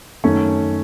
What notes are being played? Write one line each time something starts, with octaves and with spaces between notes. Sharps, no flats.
F#2 D#3 A3 C#4